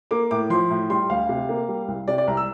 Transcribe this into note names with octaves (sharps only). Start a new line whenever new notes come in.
A#3 D6
A2 D6
F3 C6
A2
G3 C6
D2 F5
C3
A#3
G3
C2
C3 D5
D5
C2 A#5
E6